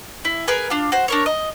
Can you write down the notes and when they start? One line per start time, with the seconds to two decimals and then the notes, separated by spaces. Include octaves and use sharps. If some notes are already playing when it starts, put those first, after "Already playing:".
0.25 E4
0.48 G#4 A#4 B4 G#5
0.70 D4 F4
0.92 F#4 C5
1.08 D4 A#4 C#5
1.26 D#5